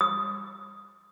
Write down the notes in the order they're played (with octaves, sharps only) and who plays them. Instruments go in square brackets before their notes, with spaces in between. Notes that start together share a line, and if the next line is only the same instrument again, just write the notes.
[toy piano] D#6